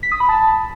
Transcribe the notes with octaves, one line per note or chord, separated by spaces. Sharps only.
B6
D#6
B5
A5